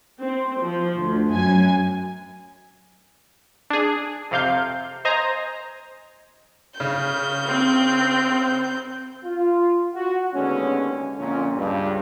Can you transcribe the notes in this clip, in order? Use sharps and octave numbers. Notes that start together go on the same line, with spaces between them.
C4
F3
D2
F#2 G#5
D4 G#4
F2 C3 F5 G6
C5 D#5 G#5 A#5
C#3 G6
C4
F4
F#4
D#2 D3 G#3 B3 C#4
F2 A#2 D3 A#3 C#4
C#2 G2